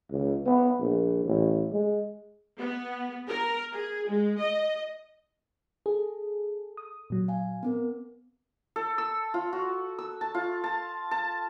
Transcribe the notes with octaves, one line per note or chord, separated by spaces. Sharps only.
C#2
B3
A#1
A1
G#3
B3
A#4
G#4
G#3
D#5
G#4 A4
D#6
A#2 F#3
F5 G#5
B3 C4 A#4
A4
E6
F4
F#4
E6
A5
F4
A5
A5